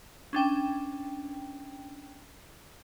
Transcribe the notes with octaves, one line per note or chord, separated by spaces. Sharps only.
C#4 D4 G5